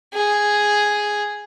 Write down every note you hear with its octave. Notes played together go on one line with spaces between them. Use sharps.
G#4